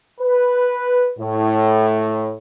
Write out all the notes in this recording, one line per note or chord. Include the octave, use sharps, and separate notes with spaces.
B4
A2